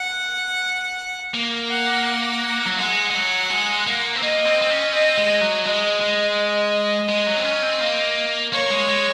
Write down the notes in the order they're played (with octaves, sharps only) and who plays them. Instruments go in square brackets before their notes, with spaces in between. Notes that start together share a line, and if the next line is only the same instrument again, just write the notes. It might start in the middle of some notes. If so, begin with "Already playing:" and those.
Already playing: [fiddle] F#5
[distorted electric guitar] A#3
[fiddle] F#5
[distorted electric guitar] F#3
[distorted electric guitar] G#3 [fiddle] F#5
[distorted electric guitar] G#3
F#3
G#3
A#3
C4
[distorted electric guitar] A#3 [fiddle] D#5
[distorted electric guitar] C4
C4
C#4
[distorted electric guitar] C4 [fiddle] D#5
[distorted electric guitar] G#3
F#3
[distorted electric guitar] G#3 [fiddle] D#5
[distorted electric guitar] G#3
G#3
F#3
C4
C#4
C4
A#3
[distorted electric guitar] A#3 [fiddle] C#5
[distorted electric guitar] G#3
G#3